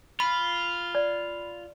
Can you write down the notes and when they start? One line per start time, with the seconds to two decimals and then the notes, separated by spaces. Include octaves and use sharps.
0.20 F4 B5
0.95 D5